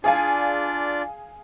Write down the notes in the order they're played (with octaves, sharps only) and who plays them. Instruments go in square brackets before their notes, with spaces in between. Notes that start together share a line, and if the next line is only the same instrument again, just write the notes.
[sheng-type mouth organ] D4 F4 D5 [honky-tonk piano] G#4 F5 G#5